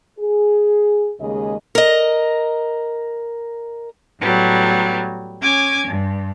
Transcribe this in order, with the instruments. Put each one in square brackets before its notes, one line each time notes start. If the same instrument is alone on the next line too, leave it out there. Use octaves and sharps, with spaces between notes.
[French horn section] G#4
D#2 C#3 G#3 G#4 D#5
[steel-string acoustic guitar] A#4 D#5
[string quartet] A2 F#3 G3 B3
C#4 G#5 D6 G#6
G2